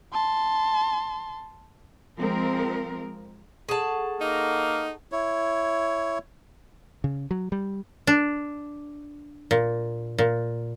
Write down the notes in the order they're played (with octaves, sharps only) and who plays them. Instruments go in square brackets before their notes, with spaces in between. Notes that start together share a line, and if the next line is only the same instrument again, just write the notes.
[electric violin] A5 C6
[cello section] F3 G#3 C4 A#4
[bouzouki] G#4 A5 [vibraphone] A4 F#5 C#6
[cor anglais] A#3 [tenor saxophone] D#4
[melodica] E4 C#5
[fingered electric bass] C#3
F#3
G3
[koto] D4
A#2
A#2